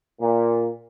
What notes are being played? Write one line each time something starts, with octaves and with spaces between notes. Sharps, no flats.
A#2